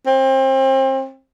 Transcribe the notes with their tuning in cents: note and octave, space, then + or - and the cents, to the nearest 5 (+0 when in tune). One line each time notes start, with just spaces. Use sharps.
C4 +30